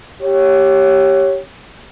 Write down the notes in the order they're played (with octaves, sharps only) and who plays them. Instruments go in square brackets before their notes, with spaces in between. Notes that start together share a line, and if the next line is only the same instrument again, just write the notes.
[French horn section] G4 C#5